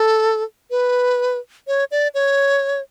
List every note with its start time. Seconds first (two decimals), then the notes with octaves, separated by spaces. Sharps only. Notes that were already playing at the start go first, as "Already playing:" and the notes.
Already playing: A4
0.70 B4
1.67 C#5
1.91 D5
2.14 C#5